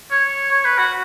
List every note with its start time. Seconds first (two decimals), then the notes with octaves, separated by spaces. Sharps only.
0.11 C#5
0.51 C#5
0.65 B4
0.78 F#4